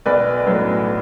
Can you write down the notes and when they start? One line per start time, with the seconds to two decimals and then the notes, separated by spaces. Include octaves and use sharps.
0.06 B1 B4 D5
0.46 A2 F#3 B4